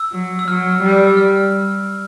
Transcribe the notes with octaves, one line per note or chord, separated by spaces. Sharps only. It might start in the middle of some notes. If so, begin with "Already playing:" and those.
Already playing: E6
F#3
E6
F#3 F6
G3
E6
F6